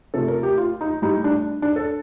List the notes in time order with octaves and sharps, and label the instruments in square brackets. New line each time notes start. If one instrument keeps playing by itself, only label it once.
[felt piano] C3 F3 A3 A4
A#4
G4
F4
D#4
A2 G3 D#4
D4
D4
A4